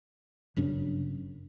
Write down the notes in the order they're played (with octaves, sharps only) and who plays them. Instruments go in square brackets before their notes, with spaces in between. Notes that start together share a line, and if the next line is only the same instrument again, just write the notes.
[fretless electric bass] G1 F#2 C#3 D4